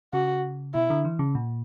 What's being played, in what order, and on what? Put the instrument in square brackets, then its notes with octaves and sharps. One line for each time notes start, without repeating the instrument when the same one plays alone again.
[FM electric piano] C#3 [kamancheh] F#4
[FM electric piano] B2 [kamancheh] E4
[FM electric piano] D3
E3
C#3
A#2